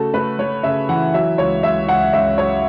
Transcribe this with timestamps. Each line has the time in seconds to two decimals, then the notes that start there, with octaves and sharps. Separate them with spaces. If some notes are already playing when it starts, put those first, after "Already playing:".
Already playing: C#3 A3 F#4 A4
0.14 A3 B4
0.39 A3 C#5
0.63 C#3 E5
0.89 E3 F#5
1.14 F#3 E5
1.38 C#2 C#5
1.63 C#2 E5
1.88 C#2 F#5
2.13 C#2 E5
2.38 F#3 C#5